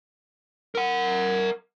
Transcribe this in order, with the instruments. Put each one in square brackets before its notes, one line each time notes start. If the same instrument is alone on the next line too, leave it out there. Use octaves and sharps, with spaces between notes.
[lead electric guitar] A#4 F#5